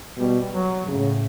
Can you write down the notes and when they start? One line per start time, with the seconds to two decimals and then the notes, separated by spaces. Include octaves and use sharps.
0.18 B2 G3
0.53 F#3
0.87 A2 C#3